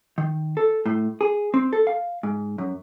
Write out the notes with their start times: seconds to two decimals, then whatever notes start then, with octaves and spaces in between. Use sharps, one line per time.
0.18 D#3
0.57 A4
0.86 A2
1.21 G#4
1.54 C4
1.73 A4
1.87 F5
2.23 G#2
2.58 F#2